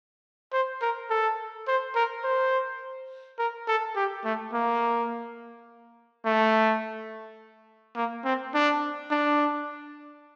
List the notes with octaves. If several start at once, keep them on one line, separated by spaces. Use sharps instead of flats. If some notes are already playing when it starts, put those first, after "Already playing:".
C5
A#4
A4
C5
A#4
C5
A#4
A4
G4
A3
A#3
A3
A#3
C4
D4
D4